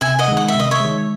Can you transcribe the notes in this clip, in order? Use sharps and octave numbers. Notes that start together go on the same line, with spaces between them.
C3 E5 G#5
D#5 F#5
D#3 G#3
F#5
E5
C3 D#5
C#5 E5
D#3 G#3